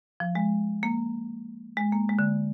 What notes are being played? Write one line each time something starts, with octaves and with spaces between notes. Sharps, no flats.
F3
G#3
A#3
G#3
A#3
G#3
D3